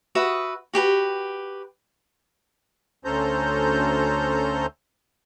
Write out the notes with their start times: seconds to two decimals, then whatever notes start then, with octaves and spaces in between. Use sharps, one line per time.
0.15 F#4 B4 E5 D#6
0.74 F#4 G4 B4 G5
3.05 D2 C#4 A4 C5 A#5 G6